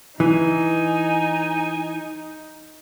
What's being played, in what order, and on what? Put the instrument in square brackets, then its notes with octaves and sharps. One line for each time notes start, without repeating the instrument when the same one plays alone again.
[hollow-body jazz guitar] E3 [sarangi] D#4 [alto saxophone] G#5